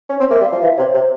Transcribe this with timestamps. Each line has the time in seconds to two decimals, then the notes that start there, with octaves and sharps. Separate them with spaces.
0.10 C#4
0.20 C4
0.30 A#3 E5
0.41 G3
0.46 F5
0.52 F3
0.62 E3 E5
0.78 C3 C#5
0.94 C3 C5